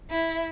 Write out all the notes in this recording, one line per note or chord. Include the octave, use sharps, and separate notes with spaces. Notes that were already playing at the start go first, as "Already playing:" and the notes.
E4